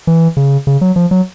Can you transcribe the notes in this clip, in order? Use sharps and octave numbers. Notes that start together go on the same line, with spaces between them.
E3
C#3
C#3
F#3
F3
F#3